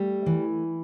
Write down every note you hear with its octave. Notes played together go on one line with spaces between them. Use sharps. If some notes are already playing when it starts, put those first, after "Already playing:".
Already playing: G3 A3
E3